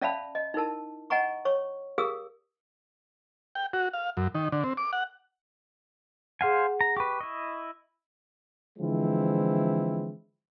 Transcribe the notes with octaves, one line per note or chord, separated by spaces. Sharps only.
C#4 D5 E5 F5 A5 B5
D#5
D#4 E4 A#4 A5
D#5 F#5 G#5 A#5 C#6
C#5 C#6
G4 G#4 A#4 F5 D#6 E6
G5
F#4
F5
F#2
D#3
D3
C4
D6
F#5
G#4 C5 F5 F#5 G#5
A#5
G4 B4 C#6
E4 D#5
D3 E3 F3 G#3 C4 E4